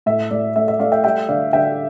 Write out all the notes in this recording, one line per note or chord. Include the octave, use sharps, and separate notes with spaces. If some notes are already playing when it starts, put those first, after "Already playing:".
A2 E5
A2 D5
A3 E5
E5
A3 D5 F5
E5 G5
G3 E5 G5
D3 D5 F5
D3 E5 G5